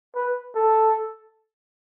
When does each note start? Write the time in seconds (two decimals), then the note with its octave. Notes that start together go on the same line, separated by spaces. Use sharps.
0.16 B4
0.55 A4